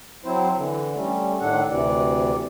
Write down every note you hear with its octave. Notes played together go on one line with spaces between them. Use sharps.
F#3 C4 E4 C5
D3 E3
G3 A3 C#4
A2 D#3 D4 A4 F#5
D2 C3 E3 D5